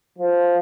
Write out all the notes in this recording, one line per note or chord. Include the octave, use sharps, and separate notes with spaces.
F3